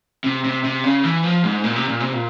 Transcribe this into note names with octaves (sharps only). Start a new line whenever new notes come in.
C3
C3
C3
C#3
E3
F3
G#2
A#2
C3
A#2
C3
A#2